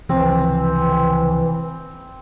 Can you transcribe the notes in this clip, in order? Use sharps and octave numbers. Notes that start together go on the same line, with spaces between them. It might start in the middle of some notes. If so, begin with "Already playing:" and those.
C#2 C3 E3 F3 C4